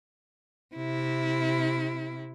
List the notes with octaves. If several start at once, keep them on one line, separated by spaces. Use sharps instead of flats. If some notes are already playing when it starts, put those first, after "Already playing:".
C3 E4